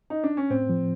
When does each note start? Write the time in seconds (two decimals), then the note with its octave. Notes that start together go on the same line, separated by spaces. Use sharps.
0.10 D#4
0.24 D4
0.37 C#4
0.50 A2 C4
0.69 F3